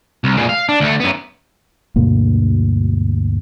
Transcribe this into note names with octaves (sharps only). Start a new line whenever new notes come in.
C2
A#2 G#3
F5
D4
D2 A3
F#2 B3
D2 G2 B2 A#3